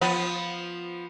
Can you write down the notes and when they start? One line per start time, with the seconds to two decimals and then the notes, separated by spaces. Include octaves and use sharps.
0.01 F3 B3